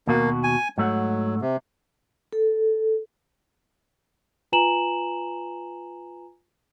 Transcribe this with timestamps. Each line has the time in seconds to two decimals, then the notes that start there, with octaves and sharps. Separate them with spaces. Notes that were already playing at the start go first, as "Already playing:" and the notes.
0.07 D#2 B2 A#3 F#4
0.44 G#5
0.78 G#2 F#3 A3 F#5
1.41 C3
2.33 A4
4.52 F4 B4 G#5 A#5 E7 F#7